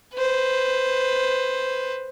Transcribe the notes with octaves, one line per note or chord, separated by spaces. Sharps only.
B4 C5